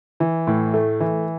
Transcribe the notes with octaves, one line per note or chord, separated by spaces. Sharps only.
E3
A2
A3
E3